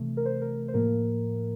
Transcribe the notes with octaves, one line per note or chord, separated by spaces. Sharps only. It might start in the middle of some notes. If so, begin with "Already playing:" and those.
Already playing: C3 E3 A3
A#4
C5
A#4
C5
A2 F3 A#3 A#4